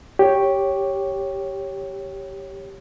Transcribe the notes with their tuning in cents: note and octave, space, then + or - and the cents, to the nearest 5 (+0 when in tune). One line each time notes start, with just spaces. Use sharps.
G4 +0 C#5 +0